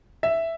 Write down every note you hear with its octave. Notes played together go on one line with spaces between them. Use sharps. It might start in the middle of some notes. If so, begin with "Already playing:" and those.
E5